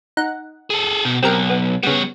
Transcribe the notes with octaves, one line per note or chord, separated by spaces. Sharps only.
D#4 F#5
G#4 A4
B2
B1 C4 G4 A#4
B3
C#3 G3 B3 C#5